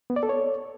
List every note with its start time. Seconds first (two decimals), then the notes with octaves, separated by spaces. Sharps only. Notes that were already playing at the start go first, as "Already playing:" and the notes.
0.10 B3
0.16 D5
0.23 A4
0.29 C#5